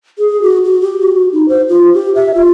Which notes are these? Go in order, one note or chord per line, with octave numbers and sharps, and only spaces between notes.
G#4
F#4
F#4
G4
F#4
F#4
D#4
C5
F4
G4
E5
F4